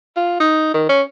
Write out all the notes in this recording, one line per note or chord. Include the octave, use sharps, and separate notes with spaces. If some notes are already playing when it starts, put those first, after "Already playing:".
F4
D#4
D#3
C#4